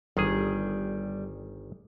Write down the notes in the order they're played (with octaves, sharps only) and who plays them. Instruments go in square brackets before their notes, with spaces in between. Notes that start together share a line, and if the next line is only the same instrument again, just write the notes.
[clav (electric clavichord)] G1 D#3 G#4 [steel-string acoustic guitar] G3